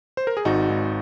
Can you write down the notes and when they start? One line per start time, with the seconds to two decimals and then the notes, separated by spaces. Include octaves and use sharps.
0.17 C5
0.27 A#4
0.37 G#4
0.45 G#1 D#4 F#4
0.70 G#1